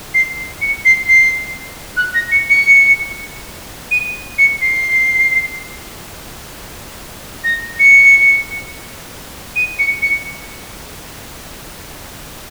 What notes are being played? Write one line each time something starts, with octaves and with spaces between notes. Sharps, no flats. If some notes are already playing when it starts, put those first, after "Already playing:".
C7
C#7
C7
C7
F#6
A#6
C#7
C#7
D#7
C#7
C7
A#6
C#7
D#7
C#7
C#7